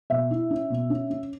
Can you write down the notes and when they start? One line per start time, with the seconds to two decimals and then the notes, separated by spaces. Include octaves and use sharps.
0.10 B2 E5
0.31 E4
0.50 C#4
0.70 B2
0.90 C#4
1.10 C#4